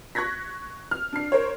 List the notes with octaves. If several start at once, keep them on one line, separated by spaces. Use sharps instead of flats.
C#6 F#6 G#6 A#6 B6
F6
D4 C7
A#4 C5 C#5